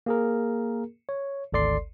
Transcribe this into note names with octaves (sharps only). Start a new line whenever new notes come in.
A#3 G#4 A#4
C#5
G#1 D2 A4 D5 C6 C7